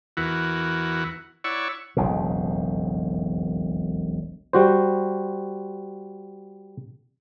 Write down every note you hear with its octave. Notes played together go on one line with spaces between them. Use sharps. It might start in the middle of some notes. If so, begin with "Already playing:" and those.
E2 E3 E4 F#4 A#4 F#5
E4 C#5 D5 F#5 C#6 E6
E1 B1 F2 C#3
G3 F#4 C5